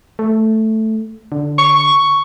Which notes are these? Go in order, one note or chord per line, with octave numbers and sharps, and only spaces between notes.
A3
D3
C#6
C#6